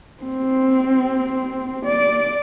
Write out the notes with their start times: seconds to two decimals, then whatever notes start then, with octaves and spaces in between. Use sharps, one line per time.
0.23 C4
1.85 D5